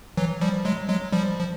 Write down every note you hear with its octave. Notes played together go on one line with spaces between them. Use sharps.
E3 F#3
F3 G3
F#3 G#3
F#3 G#3
F3 G3
F3